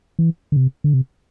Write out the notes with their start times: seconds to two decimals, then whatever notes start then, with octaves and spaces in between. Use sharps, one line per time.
0.19 E3
0.52 D3
0.56 C3
0.84 D3
0.94 C3